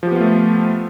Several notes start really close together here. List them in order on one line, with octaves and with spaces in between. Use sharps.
F3 G4 B3 F4 A3